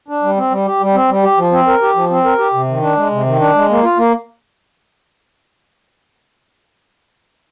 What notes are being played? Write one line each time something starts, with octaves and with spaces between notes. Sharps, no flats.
D4
G3
C4
G3
G4
G3
C4
G3
G4
F3
C4
A#4
G4
F3
C4
A#4
G4
C3
D#3
D4
G#3
C3
D#3
D4
G#3
A#3
F4
A#3